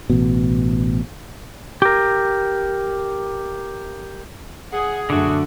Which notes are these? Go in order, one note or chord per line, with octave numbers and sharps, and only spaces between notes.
A1 B2
G4 A#4
G#4 F#5
F#2 D3 A3 D4 F#4